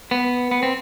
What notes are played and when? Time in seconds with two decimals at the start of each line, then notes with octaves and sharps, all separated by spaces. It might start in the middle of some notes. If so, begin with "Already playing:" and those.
0.11 B3
0.51 B3
0.63 C4